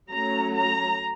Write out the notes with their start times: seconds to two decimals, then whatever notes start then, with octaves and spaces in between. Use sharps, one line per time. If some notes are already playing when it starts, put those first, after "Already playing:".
0.12 F#3 A3 C#4 A#5
0.57 A#5